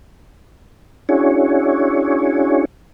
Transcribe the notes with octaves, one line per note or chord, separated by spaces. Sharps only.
C#4 D4 E4 F#4 G#4 C#5